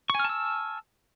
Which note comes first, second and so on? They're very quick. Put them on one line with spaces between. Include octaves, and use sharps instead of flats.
C#6 G#5 F6 A5 E6